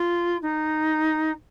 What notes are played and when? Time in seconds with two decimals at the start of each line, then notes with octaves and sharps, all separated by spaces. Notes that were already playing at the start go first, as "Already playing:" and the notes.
Already playing: F4
0.42 D#4